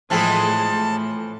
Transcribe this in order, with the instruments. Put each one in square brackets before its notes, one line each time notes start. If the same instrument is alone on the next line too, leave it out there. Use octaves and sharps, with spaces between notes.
[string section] A2 G#3 [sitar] E3 F3 C4 [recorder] A5
[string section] A2